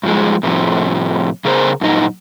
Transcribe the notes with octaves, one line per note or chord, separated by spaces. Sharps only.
G2 F3 G#3
A2 C3 F3
C#3 G#4 A#4 C5
F#2 A#2 D#4